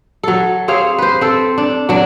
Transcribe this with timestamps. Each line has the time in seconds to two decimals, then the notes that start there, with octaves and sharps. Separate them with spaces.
0.24 F#3 A4
0.68 C4 G#4 C#5 F5
0.98 B4 C5
1.21 C4 A4
1.58 D4
1.89 F#3 D4